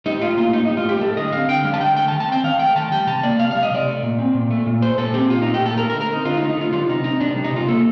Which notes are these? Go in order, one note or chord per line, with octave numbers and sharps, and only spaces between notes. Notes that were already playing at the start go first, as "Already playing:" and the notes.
G3 D#4
A2 F4
A#3 F4
A2 D#4
G3 D#4
F4
A2 G4
G3 A4
D3 D#5
C4 F5
D3 G5
G3 F5
A5
D3 G5
A3 G5
A5
D#3
A5
C4 G5
D#3 F5
A3 G5
D#3 A5
G3 G5
C3 A5
A#3 D5
C3 F5
G3 F5
D#5
C3 D5
A3
A#2
C4
A#2
A3
A#2
A3 C5
A#2 A4
C4 G4
A#2 F4
A3 D#4
G4
A#2 A4
A3 A#4
A#4
D3
A#4
C4 D#4
D3 F4
D#4
A3
D#4
D3 F4
G3 F4
C3 D#4
C4 D#4
C3 D4
G3
D#4
C3 F4
A#3 A4